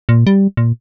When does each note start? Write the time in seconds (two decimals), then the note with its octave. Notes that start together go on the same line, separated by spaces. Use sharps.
0.09 A#2
0.27 G3
0.57 A#2